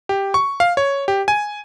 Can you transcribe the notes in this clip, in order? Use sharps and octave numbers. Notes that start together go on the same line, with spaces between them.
G4
C#6
F5
C#5
G4
G#5